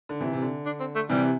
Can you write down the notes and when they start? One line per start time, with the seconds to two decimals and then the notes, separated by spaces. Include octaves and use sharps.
0.09 D3
0.20 C3 E3
0.33 C3
0.42 D3
0.66 D4
0.80 C4
0.95 A3
1.09 C3 E3 G3